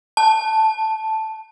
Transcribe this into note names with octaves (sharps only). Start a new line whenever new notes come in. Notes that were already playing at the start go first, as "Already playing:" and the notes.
A5